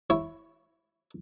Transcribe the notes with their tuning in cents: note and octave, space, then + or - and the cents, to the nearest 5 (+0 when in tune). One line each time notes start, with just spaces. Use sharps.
E4 +0 C#5 -5